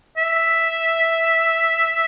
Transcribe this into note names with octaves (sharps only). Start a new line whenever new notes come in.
E5